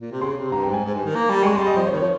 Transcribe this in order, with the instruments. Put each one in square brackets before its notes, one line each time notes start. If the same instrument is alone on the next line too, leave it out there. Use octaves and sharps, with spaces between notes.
[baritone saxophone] A#2
C3
[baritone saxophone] C#3 [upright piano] C6
[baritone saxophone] C3
[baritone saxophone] G2 [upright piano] A#5
[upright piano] G5
[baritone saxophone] G#2
[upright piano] G#5
[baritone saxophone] G#2
G2
D#3
A#3
G3
[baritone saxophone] G#3 [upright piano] C#6
[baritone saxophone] G3 [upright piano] C6
[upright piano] D#5
[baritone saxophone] F3 [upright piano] C5
[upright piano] C#5
[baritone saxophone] D#3
[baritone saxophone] F3 [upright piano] C#5